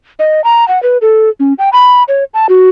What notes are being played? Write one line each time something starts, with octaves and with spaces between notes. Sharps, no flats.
D#5
A#5
F#5
B4
A4
C#4
G5
B5
C#5
A5
F#4